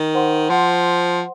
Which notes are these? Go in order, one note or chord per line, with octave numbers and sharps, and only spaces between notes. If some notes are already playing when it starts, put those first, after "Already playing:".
Already playing: D#3
C5 F#5 C6
F3 C5 F#5 C6